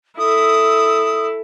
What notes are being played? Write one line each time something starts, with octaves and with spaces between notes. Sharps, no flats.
E4 A4 D#6